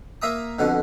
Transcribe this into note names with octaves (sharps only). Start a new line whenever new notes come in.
A#3 E5 A#5 D#6
F2 B2 D3